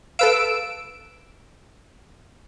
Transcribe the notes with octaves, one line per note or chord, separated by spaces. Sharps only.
A4 B4 F5 E6 D7